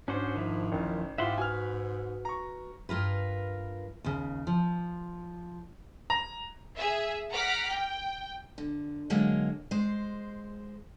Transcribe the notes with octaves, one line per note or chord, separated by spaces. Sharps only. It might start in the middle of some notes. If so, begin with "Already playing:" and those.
G#2 C#4 D4 F#4 C5
D#3 F3 E4
A1 F#2
G#2 E4 F4 G4 E5 F#5 C6
F#4 B4 G#5 F6
A#5 C#6
G2 F4 A#4 B4
D#2 C#3
F3
A#5
G#4 E5
F#5 A#5 D6 F6 B6
G5
D3
D3 F#3 G#3 A#3
G#3 C5